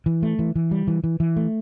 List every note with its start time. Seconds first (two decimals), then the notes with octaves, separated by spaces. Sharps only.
0.06 E3
0.23 A3
0.39 E3
0.56 E3
0.71 G3
0.88 E3
1.04 E3
1.20 E3
1.37 A3